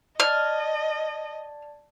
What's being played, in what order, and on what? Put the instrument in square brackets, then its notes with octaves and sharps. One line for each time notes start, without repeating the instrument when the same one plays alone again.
[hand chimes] D5 A5 A6 [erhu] D#5 [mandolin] F6